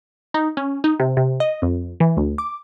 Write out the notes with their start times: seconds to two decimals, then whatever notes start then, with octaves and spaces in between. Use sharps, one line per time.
0.34 D#4
0.57 C#4
0.84 D#4
1.00 C3
1.17 C3
1.40 D#5
1.62 F2
2.00 E3
2.17 D2
2.38 D6